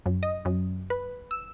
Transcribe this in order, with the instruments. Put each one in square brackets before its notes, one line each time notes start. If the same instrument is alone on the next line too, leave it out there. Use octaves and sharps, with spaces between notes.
[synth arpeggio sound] F#2
D#5
F#2
B4
E6